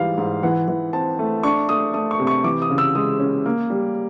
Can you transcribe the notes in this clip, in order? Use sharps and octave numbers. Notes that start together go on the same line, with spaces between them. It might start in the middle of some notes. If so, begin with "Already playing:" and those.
Already playing: G#2 E3 G3 F5
G#2
E3 F#5
E3
C4 A5
A3
D4 C#6
A3 D#6
A3 D#6
C#6
C3
C#6
E3 D6
D#6
C#3
E6
G#3 D#6
C#4
A#3
G3